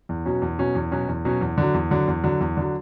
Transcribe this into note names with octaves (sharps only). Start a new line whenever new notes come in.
E2
B2 F#3 C#4
E2
B2 F#3 C#4
E2
B2 F#3 C#4
E2
B2 F#3 C#4
E2
D3 F#3
E2
D3 F#3
E2
D3 F#3
E2
D3 F#3